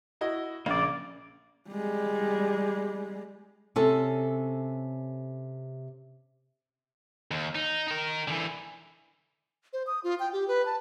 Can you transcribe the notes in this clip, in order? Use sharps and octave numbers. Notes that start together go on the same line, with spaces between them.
E4 F#4 D#5
A#1 C#3 A#3 D5
G3 G#3
C3 C#4 A4
D#2
D#4
D#4 A#4
D3 E3
C5
D#6
F4
G5
G4
B4
A5